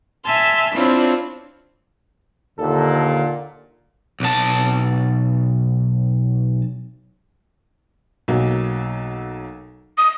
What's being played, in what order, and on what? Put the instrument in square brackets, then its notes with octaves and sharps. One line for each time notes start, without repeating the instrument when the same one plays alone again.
[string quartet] E5 G#5 A5 C6 F6
C4 D4 E4 F4 C#5
[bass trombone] D#2 [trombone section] A#2 [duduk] D3 [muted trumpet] A4
[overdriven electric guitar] B1 A5
[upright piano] B1 F#3 A#3
[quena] D#6